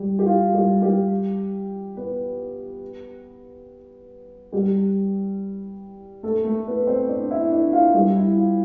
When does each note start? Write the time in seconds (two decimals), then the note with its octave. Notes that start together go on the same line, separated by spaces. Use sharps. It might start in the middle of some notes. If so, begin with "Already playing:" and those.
Already playing: G3 G4
0.19 G4
0.26 F4
0.54 G3 G4
0.82 G3 G4
1.97 B3 B4
4.52 G3 G4
6.23 A3 A4
6.44 A3 A4
6.67 B3 B4
6.87 C4 C5
7.09 D4 D5
7.31 E4 E5
7.51 D4 D5
7.73 F4 F5
7.94 G3 G4
8.16 E4
8.37 F4